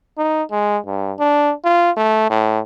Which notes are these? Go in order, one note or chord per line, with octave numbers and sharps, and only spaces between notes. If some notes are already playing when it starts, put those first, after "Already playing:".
D#4
G#3
G2
D4
F4
A3
A2